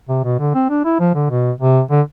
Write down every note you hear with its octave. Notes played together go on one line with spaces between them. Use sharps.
C3
B2
D3
C4
D4
E4
F3
D3
B2
C3
D3